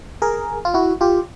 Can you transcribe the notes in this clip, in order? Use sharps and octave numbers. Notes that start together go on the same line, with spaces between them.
G#4 A#4
F4
E4 F#4
F4 G4